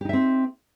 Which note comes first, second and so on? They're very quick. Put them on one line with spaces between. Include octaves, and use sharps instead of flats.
G4 D#4 E5 C4